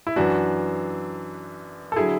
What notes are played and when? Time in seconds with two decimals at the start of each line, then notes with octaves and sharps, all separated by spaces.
0.07 E4
0.16 F#2 E3 D4 F#4
1.92 A4
1.96 D3 F#3 E4 G#4